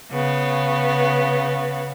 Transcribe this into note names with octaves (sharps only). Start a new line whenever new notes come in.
C#3 B3